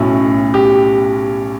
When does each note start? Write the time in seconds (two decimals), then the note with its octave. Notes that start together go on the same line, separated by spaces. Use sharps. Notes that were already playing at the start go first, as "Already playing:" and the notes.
Already playing: B1 A2 F#3 C#4
0.54 G4